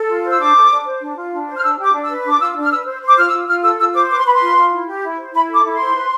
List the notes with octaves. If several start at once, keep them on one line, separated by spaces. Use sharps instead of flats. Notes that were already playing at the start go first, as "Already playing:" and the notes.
Already playing: A4
F4
C5
E6
D4 D6
A4
D4
C5
D4
F4
D4
C5
F6
D4 E6
G4 D6
D4
E6
B4
D4 D6
F4 E6
D4
F6
B4 E6
C5
C5
D6
F4 F6
E6
F4
F4 F6
A4 E6
F4 E6
C5 D6
B4 D6
C6
B4 B5
C6
F4
F4
E4
G4
E4
C5
E4 B5
A4
D6
E4
C6
C5
B4